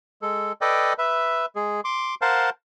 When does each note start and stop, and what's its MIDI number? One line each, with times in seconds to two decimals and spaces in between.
0.22 0.52 56
0.22 0.52 69
0.61 0.93 69
0.61 0.93 71
0.61 0.93 74
0.61 0.93 75
0.61 0.93 79
0.98 1.46 71
0.98 1.46 76
1.56 1.81 56
1.56 1.81 68
1.85 2.15 84
1.85 2.15 86
2.22 2.50 70
2.22 2.50 72
2.22 2.50 77
2.22 2.50 78
2.22 2.50 81
2.22 2.50 84